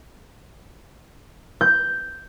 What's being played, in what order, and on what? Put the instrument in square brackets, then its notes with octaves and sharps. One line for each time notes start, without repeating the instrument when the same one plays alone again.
[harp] G6